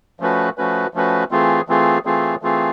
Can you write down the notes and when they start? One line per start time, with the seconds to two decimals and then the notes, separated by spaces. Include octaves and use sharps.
0.20 F3 A3 C#4 F#4 B4
0.58 F3 A3 C#4 F#4 B4
0.94 F3 A3 C#4 F#4 B4
1.31 E3 A3 C4 F4 G#4
1.68 E3 A3 C4 F4 G#4
2.05 E3 A3 C4 F4 G#4
2.42 E3 A3 C4 F4 G#4